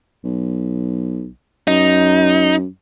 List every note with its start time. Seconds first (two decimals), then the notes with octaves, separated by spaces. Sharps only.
0.24 B1
1.68 F#2 D#4